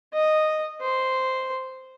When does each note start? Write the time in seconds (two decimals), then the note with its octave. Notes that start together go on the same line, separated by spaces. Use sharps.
0.14 D#5
0.81 C5